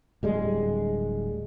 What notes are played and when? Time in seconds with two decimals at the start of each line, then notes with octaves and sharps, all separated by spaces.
0.23 D1 G3 G#3